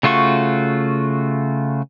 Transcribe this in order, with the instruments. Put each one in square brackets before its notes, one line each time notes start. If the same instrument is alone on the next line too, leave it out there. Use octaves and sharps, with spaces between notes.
[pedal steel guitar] C#3 A3 F4 F#4 C#6